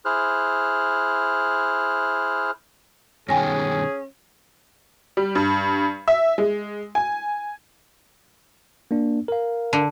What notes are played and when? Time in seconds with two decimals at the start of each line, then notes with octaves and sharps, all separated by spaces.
0.05 E4 G#4 C5 F6 F#6
3.29 G2 B2 D#3 C#4 G#4 G5 G#5 A#6
5.17 G3
5.35 G2
6.08 E5
6.38 G#3
6.95 G#5
8.91 A#3 D4
9.28 A#4 F5
9.73 D3